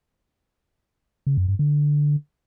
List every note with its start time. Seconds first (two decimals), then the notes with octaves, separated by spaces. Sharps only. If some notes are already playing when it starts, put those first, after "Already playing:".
1.27 C#3
1.37 F#2
1.48 G2
1.59 D3